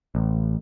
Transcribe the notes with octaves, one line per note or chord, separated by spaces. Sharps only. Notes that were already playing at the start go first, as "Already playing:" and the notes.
A1